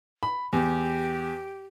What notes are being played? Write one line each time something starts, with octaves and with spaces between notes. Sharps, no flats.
B5
E2 G4